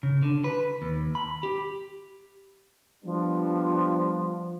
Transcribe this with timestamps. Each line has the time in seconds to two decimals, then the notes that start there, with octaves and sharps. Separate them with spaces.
0.03 C#3
0.23 D3
0.44 B4
0.82 D#2
1.15 B5
1.43 G4
3.04 F3 G3 B3 D4